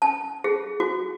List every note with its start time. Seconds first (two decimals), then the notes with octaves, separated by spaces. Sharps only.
0.02 A5
0.44 G#4
0.80 F#4